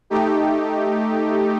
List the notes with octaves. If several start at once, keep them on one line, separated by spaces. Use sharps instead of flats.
A3 D#4 G4